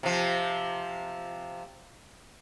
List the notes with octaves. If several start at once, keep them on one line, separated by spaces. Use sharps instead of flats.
C3 F3